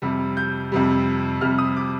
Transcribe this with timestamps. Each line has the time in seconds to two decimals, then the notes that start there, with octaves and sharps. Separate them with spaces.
0.02 F2 C3 G3
0.37 G6
0.72 F2 C3 G3
1.41 F2 C3 G3 F6
1.58 D#6
1.76 D6